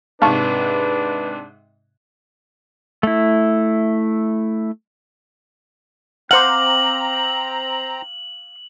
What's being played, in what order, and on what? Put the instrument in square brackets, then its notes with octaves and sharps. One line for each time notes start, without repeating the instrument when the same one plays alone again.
[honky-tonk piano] G#2 C3 [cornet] D4 [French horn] B4 [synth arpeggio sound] F5 A5 C#6
[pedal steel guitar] A3 E4
[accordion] C4 A#5 [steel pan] C5 F#5 [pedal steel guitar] F5 D6 [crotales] F#7